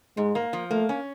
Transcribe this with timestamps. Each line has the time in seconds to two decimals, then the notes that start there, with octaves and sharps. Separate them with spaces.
0.17 G#2 G#3
0.35 A#3
0.53 F3
0.70 A3 A#3
0.89 C#4